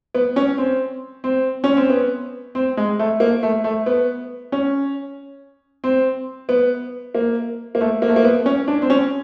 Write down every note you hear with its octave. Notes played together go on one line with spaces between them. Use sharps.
B3
C#4
C4
C4
C#4
C4
B3
C4
G#3
A3
A#3
A3
A3
B3
C#4
C4
B3
A#3
A#3
A3
A#3
A3
A#3
B3
C#4
D4
C4
C#4